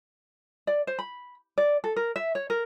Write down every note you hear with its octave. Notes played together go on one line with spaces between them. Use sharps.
D5
C5
B5
D5
A4
A#4
E5
C#5
A#4